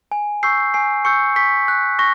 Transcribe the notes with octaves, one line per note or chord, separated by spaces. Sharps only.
G#5
C#6 E6 G6 C7
G#5 C7
C#6 E6 G6 C#7
C#6 B6
F#6
C#6 A#6